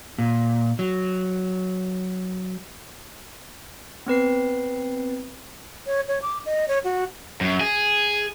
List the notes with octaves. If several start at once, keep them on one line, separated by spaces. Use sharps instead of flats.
A#2
F#3
B3 C4 B4 C7
C#5
C#5
D6
D#5
C#5
F#4
F#2
G#4